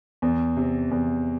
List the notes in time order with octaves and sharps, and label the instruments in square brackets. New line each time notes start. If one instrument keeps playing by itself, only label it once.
[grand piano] E2
C3
E2